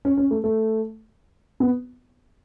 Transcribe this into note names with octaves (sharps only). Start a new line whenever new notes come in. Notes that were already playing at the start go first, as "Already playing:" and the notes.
C#4
C#4
A3
A3
B3